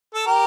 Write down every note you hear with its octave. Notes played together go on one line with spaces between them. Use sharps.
A4
G4 A#4